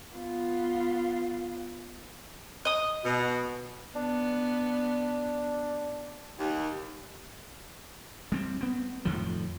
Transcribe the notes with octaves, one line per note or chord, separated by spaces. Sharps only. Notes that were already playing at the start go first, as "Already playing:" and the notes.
B3 F4
D#5 D#6
B2
B3 D4
D#2
G3 C4
B3 C4
F2 A2 D#3 F3